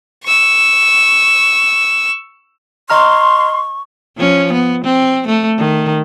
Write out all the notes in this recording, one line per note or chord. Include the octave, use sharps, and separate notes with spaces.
C#6 E6
D#5 A#5 C6 C#6 F6
F3 C#4
B3
C4
A3
D#3